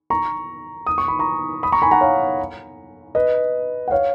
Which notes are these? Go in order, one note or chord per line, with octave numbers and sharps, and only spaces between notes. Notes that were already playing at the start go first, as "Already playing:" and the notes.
A#5 C#6
D#6
C#6
B5
A#5 C#6
B5 D#6
A#5 C#6
G#5 B5
F#5 A#5
C#5 F5
B4 D#5
F#5
C#5 F5